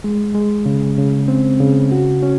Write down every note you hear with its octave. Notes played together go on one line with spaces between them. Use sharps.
G#3
G#3
C#3
C#3
C4
C#3
F#4
C#4